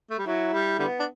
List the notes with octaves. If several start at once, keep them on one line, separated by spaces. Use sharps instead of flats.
A3
G3
F#3 E4
G3
D3 G3 B3
D4